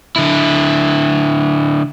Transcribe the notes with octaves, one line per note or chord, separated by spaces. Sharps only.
D3 E4